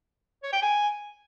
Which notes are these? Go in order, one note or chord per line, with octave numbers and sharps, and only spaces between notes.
C#5
G5
G#5